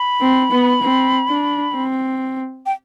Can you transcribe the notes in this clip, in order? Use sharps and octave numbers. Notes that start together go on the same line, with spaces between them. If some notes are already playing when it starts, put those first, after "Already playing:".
Already playing: B5
C4
B3
C4
D4
C4
G5